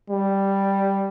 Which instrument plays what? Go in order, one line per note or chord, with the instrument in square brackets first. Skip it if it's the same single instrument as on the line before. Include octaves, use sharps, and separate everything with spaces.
[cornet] G3